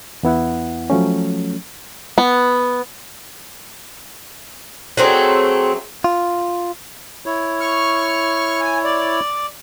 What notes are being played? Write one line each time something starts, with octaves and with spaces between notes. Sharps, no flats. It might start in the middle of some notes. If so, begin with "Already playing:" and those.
E2 B3 E4 F#5
F3 F#3 A3 C#4
B3
F#3 A3 C4 G#4
F4
E4 C#5
C#6 F6
G#5
D5